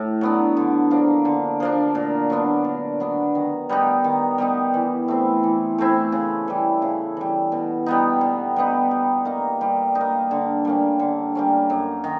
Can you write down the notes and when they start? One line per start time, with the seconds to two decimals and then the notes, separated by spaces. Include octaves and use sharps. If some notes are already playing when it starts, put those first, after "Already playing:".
Already playing: A2
0.21 F#3 B3 D4
0.57 D3
0.90 F3 A#3 D4
1.25 D3
1.60 F3 A#3 D4
1.95 A#2
2.30 F#3 B3 D4
2.64 A#2
3.00 F#3 B3 D4
3.35 D#3
3.69 G3 B3 D#4
4.04 D#3
4.38 G3 B3 D#4
4.74 E3
5.08 A3 C4 E4
5.43 E3
5.78 A3 C4 E4
6.12 C#3
6.48 E3 G3
6.82 C#3
7.17 E3 G3
7.52 B2
7.86 G3 B3 D#4
8.21 B2
8.56 G3 B3 D#4
8.91 G3
9.25 A#3 D#4
9.61 G3
9.95 D#4
10.01 A#3
10.31 D3
10.65 G3 A#3 C#4
10.99 D3
11.35 G3 A#3 C#4
11.70 F#2
12.04 D#3